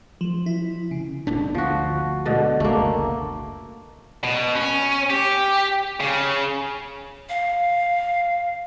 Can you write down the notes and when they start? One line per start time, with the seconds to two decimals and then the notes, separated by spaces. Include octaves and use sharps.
0.21 F3
0.46 E4
0.91 C#3
1.27 F#1 B2 D4
1.55 D2 F3 F#4
2.26 B2 D3
2.60 F#1 C#2 A3 A#3
4.23 B2
4.55 C#4
5.10 G4
6.00 C#3
7.29 F5